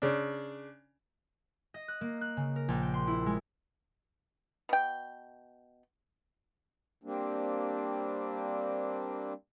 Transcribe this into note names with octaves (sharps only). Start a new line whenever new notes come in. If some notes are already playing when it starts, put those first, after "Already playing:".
C#3 D4
D#5
F#6
A#3
F#6
C#3
A#4
A#1
G5
C6
E4
G#3
B2 G5
G3 A#3 C4 D4